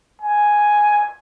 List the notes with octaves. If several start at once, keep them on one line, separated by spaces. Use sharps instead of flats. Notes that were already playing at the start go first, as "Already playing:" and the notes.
G#5